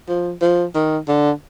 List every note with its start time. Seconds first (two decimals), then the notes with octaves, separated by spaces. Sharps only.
0.09 F3
0.42 F3
0.75 D#3
1.08 D3